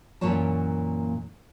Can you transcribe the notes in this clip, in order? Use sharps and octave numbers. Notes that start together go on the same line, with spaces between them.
F#2 A#2 E3 A#3 C#5 A5